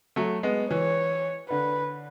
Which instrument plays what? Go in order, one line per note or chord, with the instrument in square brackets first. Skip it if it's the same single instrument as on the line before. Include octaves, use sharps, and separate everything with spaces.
[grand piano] F#3 A3
G#3 B3
[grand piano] E3 [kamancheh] C#5
[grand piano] D3 [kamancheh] B4